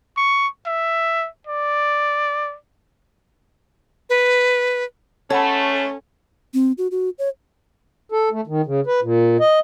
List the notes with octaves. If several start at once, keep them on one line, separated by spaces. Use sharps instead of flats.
C#6
E5
D5
B4
E3 G#3 A3 C#4 A4 C#5 F#5 B5
C4
F#4
F#4
C#5
A4
A3
D#3
C#3
B4
A#2
D#5